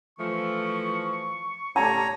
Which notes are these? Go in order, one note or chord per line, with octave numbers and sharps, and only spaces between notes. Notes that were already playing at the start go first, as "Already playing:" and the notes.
E3 F3 A3 C#6
A2 G3 A3 C#5 A5 A#5